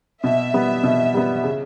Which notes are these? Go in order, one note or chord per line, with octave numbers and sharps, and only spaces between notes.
B2 E5
G3 B3
B2
G3 B3
C#3